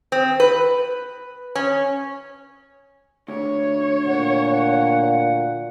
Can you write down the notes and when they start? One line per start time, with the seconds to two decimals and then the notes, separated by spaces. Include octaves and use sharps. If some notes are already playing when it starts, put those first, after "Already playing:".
0.12 C4
0.40 B4
1.55 C#4
3.28 D2 C#5
4.07 A#2 F#5